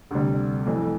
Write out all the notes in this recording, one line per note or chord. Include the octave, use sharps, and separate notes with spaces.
D2 C3 G3
F2 E3 A3